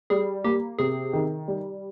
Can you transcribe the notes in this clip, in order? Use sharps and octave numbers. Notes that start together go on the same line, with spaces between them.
G3 G#4
A#3 G4
C3 G#4
D#3
G3